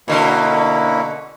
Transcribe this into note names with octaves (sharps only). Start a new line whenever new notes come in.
B2 D3 A#3 C#4 E4